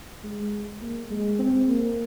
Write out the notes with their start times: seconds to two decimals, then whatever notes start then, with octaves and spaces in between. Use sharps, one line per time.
0.24 G#3
0.81 A#3
1.10 G#3
1.39 C4
1.68 A#3